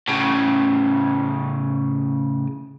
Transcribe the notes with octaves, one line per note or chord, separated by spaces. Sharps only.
A2 C#3